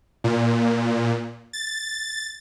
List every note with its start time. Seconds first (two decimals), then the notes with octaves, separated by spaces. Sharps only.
0.24 A#2
1.53 A6